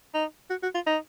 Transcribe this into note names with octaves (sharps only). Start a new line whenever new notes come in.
D#4
F#4
F#4
F4
D#4